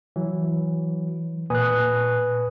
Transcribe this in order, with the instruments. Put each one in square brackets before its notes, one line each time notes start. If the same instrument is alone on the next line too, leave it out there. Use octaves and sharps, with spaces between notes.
[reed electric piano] E3 [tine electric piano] F#3
[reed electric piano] A#2 F#6 [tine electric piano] B4 G#5 D#6